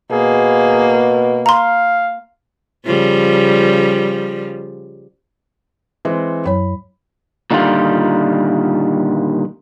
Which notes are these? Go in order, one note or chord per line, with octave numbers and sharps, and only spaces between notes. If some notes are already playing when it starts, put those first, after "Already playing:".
B2 A#3 G#4
F5 A#5 C6
C#3 F3 G3
E3 G#3 C4
F#2 F#3 C#5 B5
A#2 D3 D#3 G3 F4